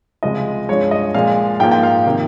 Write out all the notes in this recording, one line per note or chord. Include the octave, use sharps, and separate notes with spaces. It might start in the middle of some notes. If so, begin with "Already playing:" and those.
C#2 C3 F3 G#3 D#5
G2 F3 G#3 C#5
D#5
A#2 F3 G#3 F5
G#2 F3 A#3 G5
G5
F5
C3 D#3 A#3